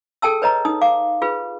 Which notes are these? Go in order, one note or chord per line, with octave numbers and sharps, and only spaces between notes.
G#4 A4 G5 A5 E6
B4 C#5 D#5 A#5
D#4 D#6
F5 D6
F4 G#4 B4